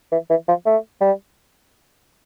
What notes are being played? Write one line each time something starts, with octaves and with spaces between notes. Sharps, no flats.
E3
E3
F3
A3
G3